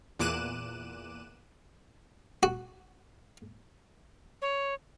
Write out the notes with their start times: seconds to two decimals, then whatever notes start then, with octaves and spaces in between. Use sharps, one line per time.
0.19 E2 A#2 D6 F#6 D#7 E7
2.43 F#4
4.42 C#5